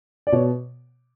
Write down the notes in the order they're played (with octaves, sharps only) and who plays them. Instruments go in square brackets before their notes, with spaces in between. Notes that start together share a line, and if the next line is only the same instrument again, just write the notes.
[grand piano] D5
B2 C#5